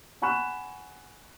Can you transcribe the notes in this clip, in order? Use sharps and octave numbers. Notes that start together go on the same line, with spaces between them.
F#5 G#5 B5 C#6 F#6 E7